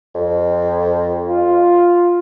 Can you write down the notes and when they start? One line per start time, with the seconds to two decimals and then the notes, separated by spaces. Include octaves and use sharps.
0.15 F2
1.28 F4